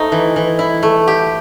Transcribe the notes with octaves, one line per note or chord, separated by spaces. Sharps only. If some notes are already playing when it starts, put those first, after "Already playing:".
Already playing: A3 D#4 C5
E3
E3
E4
A3
G4